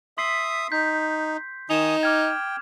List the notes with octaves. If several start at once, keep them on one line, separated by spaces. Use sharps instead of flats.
E5 C6 D#6 B6 C7
D#4 G6 B6
D#3 D#4 G#5 D#6 E7 F7
G5 D6 F6 G#6